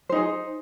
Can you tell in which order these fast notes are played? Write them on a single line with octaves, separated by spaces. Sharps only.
C5 D#4 G#4